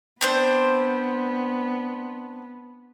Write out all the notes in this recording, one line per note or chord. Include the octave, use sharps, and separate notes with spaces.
B3 C4 D4 C5